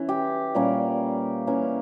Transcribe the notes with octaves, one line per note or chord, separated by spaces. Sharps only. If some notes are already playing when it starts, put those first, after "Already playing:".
Already playing: E3 C#4
G4
A#2 G3 A#3 C#4
E3 A#3 C#4